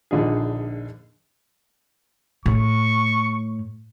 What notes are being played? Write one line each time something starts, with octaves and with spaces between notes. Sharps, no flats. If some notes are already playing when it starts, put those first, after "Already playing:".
A#1 D3 F3 D#4 G#4
A2 C#6